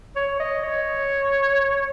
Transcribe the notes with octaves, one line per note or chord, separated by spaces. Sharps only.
C#5
D#5
C#5